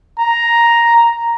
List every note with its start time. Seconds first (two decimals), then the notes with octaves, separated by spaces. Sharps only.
0.20 A#5